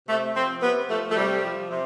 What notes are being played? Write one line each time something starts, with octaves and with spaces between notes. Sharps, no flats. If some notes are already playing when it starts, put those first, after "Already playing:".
C3 A3
F3 C4
C3 B3
F3 A3
A3
C3 G3
F3
C3